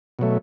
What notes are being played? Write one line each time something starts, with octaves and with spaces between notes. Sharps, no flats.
B2 F#3 A3